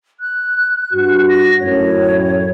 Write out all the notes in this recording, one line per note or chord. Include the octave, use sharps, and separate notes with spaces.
F#6
G2 F#4
A#6
F#2 A2 C#5